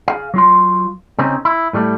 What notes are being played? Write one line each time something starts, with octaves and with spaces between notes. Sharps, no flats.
G#4 F5
F#3 F4 C6
C#3 C4 C#4 D#4
E4
A2 F#3 G3 A3